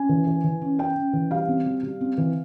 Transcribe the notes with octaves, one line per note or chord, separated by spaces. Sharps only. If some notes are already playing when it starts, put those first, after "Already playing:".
Already playing: C#4 G#5
E3
E3
E3
C#4
C#4 G5
C#4
E3
G3 F5
C4
G3
G3
C4
E3